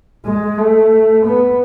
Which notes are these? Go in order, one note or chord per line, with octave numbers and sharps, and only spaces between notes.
G#3
A3
B3